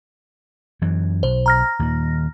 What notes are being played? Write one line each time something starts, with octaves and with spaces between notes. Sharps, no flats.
F#2 E3 F#3
B1 C5
A#5 F6 A#6
D#2 A#2 D#3